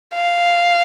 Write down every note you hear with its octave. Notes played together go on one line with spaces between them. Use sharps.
F5